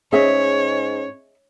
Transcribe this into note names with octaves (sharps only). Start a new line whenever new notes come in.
G#2 C#4 G#4 C#5 D#5 E5